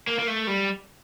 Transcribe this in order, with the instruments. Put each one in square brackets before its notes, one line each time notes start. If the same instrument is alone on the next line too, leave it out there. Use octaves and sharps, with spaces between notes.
[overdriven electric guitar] A#3
A#3
A3
G3